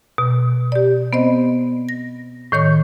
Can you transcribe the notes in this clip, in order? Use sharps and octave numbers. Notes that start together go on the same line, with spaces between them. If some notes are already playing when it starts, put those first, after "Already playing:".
B2
G4 D5
B3 C4 C5 D#5
A#6
A2 D#3 C#5 C#6